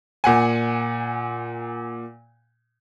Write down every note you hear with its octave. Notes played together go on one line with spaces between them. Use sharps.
A#2 F#5 G#5